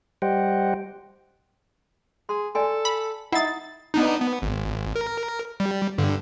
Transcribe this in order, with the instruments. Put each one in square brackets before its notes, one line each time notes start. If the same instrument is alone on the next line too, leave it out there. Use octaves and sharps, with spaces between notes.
[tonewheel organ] G3 G4 C5 D#5 F#5 G5
[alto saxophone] G#4 [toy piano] C6
[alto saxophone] A4 [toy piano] D5 G#5 C6
[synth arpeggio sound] B5
[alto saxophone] D#4 [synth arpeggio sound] E4 A6 [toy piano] F#5 A#5 D#6
[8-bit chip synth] B3 D4 D#4
B3
G#1
A#4
G3
G2 D3